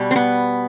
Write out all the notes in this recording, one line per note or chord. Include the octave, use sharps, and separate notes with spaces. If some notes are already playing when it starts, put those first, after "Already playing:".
Already playing: B2 G3
C4
B3